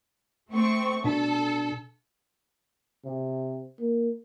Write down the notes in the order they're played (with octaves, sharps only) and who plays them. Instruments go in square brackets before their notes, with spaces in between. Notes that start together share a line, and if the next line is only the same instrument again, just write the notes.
[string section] A3 C4 C#6
[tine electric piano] B2 D4 [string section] A4
[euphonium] C3
A#3